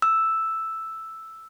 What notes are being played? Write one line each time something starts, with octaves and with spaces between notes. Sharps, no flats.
E6